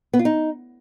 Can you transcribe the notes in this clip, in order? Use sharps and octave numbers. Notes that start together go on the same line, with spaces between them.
B3
F4
D#4